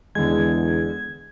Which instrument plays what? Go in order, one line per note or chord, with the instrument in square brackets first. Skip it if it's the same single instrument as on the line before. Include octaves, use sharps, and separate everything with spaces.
[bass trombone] E2 [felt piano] D3 G#3 [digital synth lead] G#6